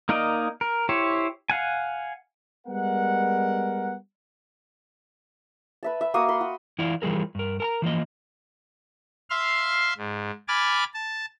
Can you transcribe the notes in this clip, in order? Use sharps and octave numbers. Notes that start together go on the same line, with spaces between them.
A#3 D#4 A#4 D5 D#5
A#4
E4 G4 C5 C#5
F5 F#5 G#5
G3 G#3 B3 A#4 F#5
B4 E5 A5
E5
A#3 F#4 F5 D#6
B5 C6
F#4
E3 E4 F4 D5 F5
E3 F3 G3 G#4 A#4
G2 A#4
A#4 A5 A#5
E3 F3 A#3 D#5
E5 F5 C6 F6
G#2
G#5 B5 D6 F6 A6
A5